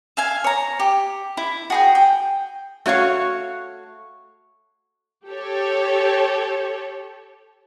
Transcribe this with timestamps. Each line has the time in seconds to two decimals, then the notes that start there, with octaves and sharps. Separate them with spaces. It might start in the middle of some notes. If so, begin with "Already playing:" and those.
0.17 E5 F5 G#5
0.44 C#5 A#5
0.79 G4
1.37 E4
1.70 F#4 G#4 G5
1.95 G5
2.86 A3 F#4 C#5 F5
5.29 G4 A4 C#5